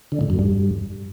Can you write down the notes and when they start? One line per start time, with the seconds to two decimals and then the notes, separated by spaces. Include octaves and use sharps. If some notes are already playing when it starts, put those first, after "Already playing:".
0.12 D3
0.21 A2
0.30 F#2
0.39 G2